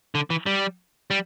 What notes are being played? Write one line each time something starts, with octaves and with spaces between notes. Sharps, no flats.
D3
E3
G3
G3